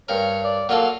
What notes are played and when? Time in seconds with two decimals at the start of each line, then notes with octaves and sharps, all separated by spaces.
0.09 G2 A#4 C#5
0.44 D5
0.69 F#3 A#3 F4 A4